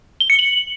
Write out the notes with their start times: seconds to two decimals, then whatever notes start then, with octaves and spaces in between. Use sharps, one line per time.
0.20 G7
0.30 C#7
0.39 F#7